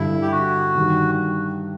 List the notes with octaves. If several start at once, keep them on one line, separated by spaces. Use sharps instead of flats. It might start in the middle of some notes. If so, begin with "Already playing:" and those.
Already playing: G2 D3 G3 E4
G4
F#4
G2 D#3 G3